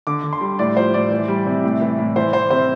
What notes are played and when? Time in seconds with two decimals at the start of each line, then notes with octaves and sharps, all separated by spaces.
0.07 D3 D6
0.24 D3
0.33 C6
0.41 G3
0.59 A2 D5
0.77 F3 C5
0.94 A2 D5
1.11 E3
1.28 G3
1.46 C3
1.64 A2
1.81 E3
1.98 A2
2.16 E3 C5
2.33 E3 C5
2.50 C3 C5